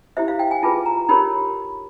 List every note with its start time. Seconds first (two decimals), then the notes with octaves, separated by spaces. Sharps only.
0.17 E4 G4 C5 E5
0.28 F5
0.39 G5
0.51 G#5
0.63 F4 G#4 B4 A5
0.86 A#5
1.09 D#4 G4 A#4 C#5 B5